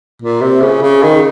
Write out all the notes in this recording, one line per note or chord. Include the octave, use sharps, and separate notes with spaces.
A#2
C3
C#3
C#3
D#3